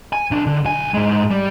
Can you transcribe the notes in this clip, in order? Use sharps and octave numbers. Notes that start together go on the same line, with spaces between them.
G#5
B1 D4
D3
B1 G#5
G#2 G#3
G3